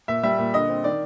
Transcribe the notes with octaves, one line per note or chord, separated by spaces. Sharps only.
A#2 E5
G3 E5
A#2
D3 D#5
C4
D#3 D5